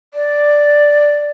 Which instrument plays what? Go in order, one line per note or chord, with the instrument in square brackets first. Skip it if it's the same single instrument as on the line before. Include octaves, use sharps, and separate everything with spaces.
[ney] D5